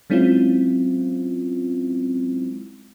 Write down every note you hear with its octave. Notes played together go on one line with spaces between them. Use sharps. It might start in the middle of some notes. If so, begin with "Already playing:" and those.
F#3 G#3 C4 C#4 E4 F4